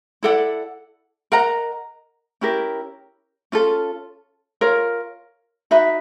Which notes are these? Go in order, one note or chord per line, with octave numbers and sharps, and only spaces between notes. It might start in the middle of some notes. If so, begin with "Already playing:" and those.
E4 A4 D5 F#5
A#4 D#5 F#5 A#5
C#4 E4 G4 A#4
C#4 F4 A4
F4 A#4 C#5
D#4 F#4 B4 E5